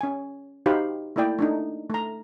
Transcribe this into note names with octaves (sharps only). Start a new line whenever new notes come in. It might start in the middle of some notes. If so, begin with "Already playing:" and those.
C#4 G#5
D#4 F#4 G4 C5 F5 B5
A3 A#3 E4 D5 G5
A3 D4 D#4
A3 A#5